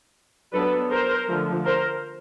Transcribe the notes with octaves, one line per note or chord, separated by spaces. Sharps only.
F#3 B3 D4 A4 B4
A#4 C5
D3 F3 A3
A#4 C5